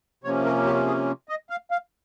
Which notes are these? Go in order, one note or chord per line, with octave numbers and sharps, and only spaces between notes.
C3 F3 A#3 C#4 C#5
A#4
G4
G#4
D#5
F5
F5